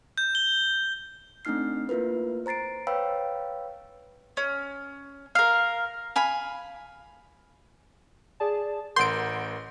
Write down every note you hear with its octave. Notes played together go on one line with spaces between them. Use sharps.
G6
G7
A3 C4 D4 D#4 F6 C7
A#3 E4 F4 A#4 B4
C5 A#5 A6 C7 D7
B4 C#5 F5 G5 B5 E6
C#4
A#4 F5
F5 G#5 B5
G#4 D5 A5
A1 A#4 F#5 C6 G6 D7